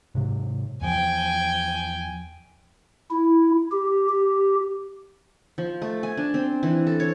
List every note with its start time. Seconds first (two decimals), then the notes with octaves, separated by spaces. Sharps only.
0.15 G#2 C3 F#3
0.81 E2 F3 G5 G#5
3.10 E4
3.71 G4
4.09 G4
5.58 F3
5.82 A3
6.03 G#5
6.17 D4
6.34 C4
6.63 E3
6.87 A4
7.00 C#5